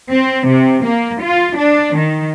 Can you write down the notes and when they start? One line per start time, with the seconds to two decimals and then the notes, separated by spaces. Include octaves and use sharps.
0.10 C4
0.48 C3
0.86 A#3
1.22 F4
1.57 D4
1.97 D#3